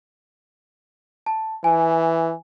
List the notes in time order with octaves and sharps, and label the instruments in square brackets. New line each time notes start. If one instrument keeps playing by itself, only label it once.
[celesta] A5
[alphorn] E3 [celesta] G#5